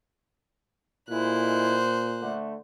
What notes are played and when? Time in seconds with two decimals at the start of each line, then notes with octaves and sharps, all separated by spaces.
1.10 A#2 G#3 A3 E4 C5 F#6
2.21 D3 A3